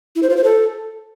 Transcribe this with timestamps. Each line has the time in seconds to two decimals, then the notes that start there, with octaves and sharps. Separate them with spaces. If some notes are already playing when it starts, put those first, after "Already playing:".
0.16 E4
0.23 C5
0.30 F4
0.37 C5
0.44 A4